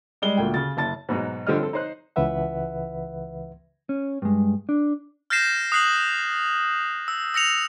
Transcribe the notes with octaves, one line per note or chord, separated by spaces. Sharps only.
G3 G#3 G7
D2 A#2 G5
C#3 A6
F#1 A5 A6
G#2 B2 F#3 D#4
D3 F3 G3 G4 D#5 F6
C4 A4
D#4 C5 F#6
C#2 C#3 E3 B4 E5 F#5
C#4
G2 G#3
D4
F6 G6 A6 A#6 C7 E7
D#6 F#6 C7 F#7
E6
E6 A#6 C#7 F7